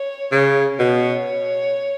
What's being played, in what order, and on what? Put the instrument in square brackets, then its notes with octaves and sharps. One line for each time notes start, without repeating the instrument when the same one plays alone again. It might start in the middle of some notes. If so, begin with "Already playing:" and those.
Already playing: [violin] C#5
[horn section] C#3
[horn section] B2 [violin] C#5